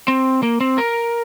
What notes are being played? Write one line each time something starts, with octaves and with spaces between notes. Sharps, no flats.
C4
A#3
C4
A#4